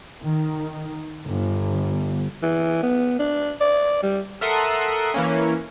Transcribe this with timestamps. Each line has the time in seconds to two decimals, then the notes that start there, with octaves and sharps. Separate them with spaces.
0.24 D#3
1.28 G1
2.43 E3
2.82 B3
3.19 D4
3.61 D5
4.03 G3
4.41 A4 A#4 E5 F#5 C6 D#6
5.14 E3 A#3 C#4